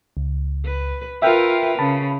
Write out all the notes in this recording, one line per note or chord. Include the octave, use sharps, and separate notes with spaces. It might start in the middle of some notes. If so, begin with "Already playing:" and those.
C#2
B4
F4 A#4 B4 E5 G5 F6
C#3 A5 B5